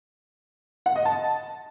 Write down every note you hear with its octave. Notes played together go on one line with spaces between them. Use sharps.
F#5
D#5
A5